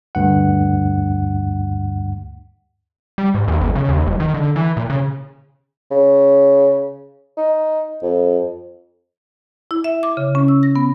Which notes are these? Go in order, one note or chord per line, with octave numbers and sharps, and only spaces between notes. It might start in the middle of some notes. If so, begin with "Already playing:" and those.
D2 G2 F#5
G3
G#2
D#2
G1
C#3
D#2
D#1
D#3
D3
E3
A#2
C#3
C#3
D#4
F2
E4
E5
D6
C#3
C#4
E6
A#6
B3